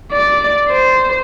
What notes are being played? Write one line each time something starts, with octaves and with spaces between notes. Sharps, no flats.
D5
C5